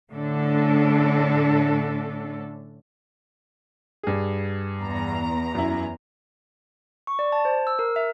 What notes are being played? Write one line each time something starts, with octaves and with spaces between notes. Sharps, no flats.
A2 D3 C#4 D4 A4
G2 G#4
E2 A#5
F#2 E4
C#6
D5
A5
C5
E6
A#4
E5